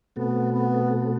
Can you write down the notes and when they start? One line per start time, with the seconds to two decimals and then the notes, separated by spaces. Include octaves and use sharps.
0.16 B2 A3 B3 C4 F#4 A4
0.53 B3